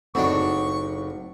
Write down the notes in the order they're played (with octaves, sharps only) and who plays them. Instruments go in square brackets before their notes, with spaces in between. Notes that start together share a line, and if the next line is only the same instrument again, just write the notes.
[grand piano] F#1 D#4 F#5 [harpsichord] A2 F#3 D4 [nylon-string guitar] C4 [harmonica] C#6